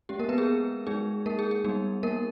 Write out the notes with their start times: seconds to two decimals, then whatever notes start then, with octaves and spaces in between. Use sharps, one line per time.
0.09 G#3 C#4 G4
0.19 A#3 A#4
0.29 B3 B4
0.38 G#4
0.86 G#3 D#4 G#4
1.26 A#3 A#4
1.39 G#4
1.51 G#4
1.64 G3 B3 D#4 G#4
2.03 A#3 A#4